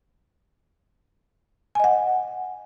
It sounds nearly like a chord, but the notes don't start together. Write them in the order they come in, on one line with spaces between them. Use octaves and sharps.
G#5 D#5 F#5